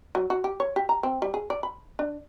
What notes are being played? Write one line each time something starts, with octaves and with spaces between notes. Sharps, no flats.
F#3
F#4
G4
C#5
G4
A#5
C4
G3
G#4
D5
B5
D4